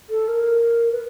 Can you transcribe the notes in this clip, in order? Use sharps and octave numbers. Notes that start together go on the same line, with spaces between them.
A4
A#4
B4